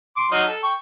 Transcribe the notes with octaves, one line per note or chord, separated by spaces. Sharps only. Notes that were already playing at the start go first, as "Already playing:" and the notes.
C6 D6
F#3 D#4 F5
A4
G5 C#6